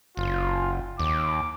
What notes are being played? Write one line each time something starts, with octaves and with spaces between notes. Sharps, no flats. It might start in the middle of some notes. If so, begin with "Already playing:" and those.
F#1 F4
D#2 D6